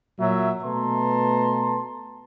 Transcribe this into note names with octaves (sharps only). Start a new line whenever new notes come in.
A#2 F#3 E5
B2 A3 B4 A5 A#5 C6